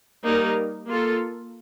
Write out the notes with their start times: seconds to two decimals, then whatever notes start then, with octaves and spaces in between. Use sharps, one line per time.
0.25 G3 A#3 D#4 A#4
0.88 A#3 F4 A4